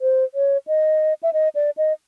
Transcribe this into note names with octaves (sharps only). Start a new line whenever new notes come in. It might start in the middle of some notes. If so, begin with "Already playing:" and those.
C5
C#5
D#5
E5
D#5
D5
D#5